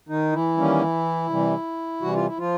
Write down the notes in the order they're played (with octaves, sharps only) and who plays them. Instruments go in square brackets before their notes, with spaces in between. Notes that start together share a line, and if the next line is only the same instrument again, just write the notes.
[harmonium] D#3 D#4
E3 E4
D#3 G3 A#3 C#4
C3 E3 G3
C3 E3 G3 F#4
F4
E4
F3 F4